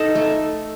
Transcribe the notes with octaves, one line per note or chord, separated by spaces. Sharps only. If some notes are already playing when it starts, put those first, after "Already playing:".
Already playing: D#4 A4
A3